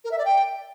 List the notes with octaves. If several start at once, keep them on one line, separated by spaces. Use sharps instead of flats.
A#4
E5
D5
G5